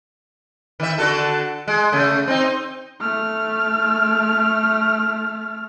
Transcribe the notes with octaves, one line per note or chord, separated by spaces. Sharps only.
D#3 E5
D3 F#4 A4
G#3
C#3 A3
C4 D#4
A3 F6